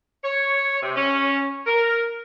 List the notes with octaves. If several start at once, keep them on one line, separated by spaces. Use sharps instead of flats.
C#5
C3
C#4
A#4